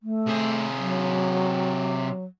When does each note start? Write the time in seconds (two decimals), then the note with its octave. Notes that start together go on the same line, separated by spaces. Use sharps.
0.03 A3
0.27 C3 G#4
0.78 F#3